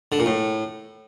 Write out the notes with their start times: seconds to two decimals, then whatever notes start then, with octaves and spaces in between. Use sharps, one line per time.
0.12 D3
0.19 A#2
0.26 A2